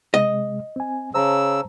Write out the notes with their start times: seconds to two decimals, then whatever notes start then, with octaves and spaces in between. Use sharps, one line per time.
0.14 C3 G#3 D#5
0.76 C4 G#5
1.14 C#3 C5 A5 A#5 E6